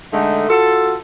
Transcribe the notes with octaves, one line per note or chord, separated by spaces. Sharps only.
D3 G#3 A3 D#4
F4 F#4 A4